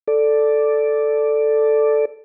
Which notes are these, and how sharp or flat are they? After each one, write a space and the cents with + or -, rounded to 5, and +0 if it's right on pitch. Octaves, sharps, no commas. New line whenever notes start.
A4 +0 D5 +0